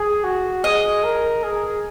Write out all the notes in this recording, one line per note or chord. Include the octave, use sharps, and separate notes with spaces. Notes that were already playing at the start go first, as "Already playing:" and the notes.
Already playing: G#4
F#4
G#4 D#5
A#4
G#4